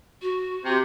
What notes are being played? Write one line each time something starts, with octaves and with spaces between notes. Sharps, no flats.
F#4
C3